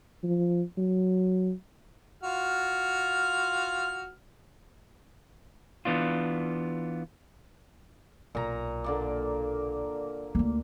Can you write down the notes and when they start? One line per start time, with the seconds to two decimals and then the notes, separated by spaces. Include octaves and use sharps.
0.23 F3
0.77 F#3
2.23 F4 F#4 F6
5.85 E3 B3 D4 F4
8.35 B1 A#2 A#5
8.84 D3 A#3 D5
10.35 D2 A#3